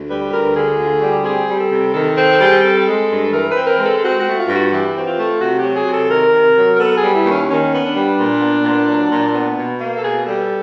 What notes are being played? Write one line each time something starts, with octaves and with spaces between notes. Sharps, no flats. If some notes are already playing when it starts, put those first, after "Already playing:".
Already playing: D2
G3 B4
D2 A#4
D3 G#4
D2
F4
G3 F#4
G4
C4 G#4
G3
A4
C3
D#3 A4
C4 A4
A4
G3 G#4
C4 A4
G#3
G2
E3 A#4
B4
C4
A#4
G#3
A4
C4 F#4
F#4
A3
F4
G2
F#4
E3 G4
C4
F#4
F4
A3
C3 F#4
G4
F#3
G#4
C3
A4
D#3 A#4
C3
F#3
A#4
B3 A4
G#4
G3
E4
D#2
C#4
D#3 C#4
B3
D4
G3
A#2
B3
A#2
F#3
A#2
B3
B2
A#3
A4
B2 G#4
G3 A4